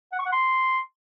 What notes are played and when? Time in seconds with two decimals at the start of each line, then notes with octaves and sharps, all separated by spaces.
0.13 F#5
0.19 C#6
0.26 F#5
0.32 C6